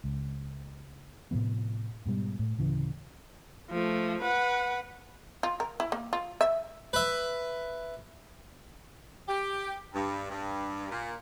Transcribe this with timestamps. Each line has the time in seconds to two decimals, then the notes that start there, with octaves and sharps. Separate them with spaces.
0.04 C#2
1.31 A2 C3 F3 B3
2.06 G#2 B2 G3
2.39 A2
2.58 D1 C#3 E3
3.70 F3 A3
4.22 B4 F#5
5.43 F4
5.60 A#4
5.80 E4
5.92 A#3
6.13 F4
6.41 E5
6.93 B4 E5
9.28 G4
9.94 G2
10.31 G2
10.91 A#2